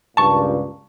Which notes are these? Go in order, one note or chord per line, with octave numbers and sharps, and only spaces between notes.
C#2 G2 A#2 A5 C#6